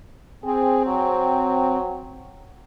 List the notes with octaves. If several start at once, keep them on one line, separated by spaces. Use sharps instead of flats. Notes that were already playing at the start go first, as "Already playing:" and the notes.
C4 G#4
F#3